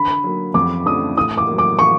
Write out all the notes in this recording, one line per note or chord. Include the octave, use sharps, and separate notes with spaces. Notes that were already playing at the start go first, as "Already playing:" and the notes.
Already playing: D3 B5
F#3 A#3
F2 D6
C#3 F3 A3 D4 D#6
A2 D#6
D6
F#3 A#3
D6
C#6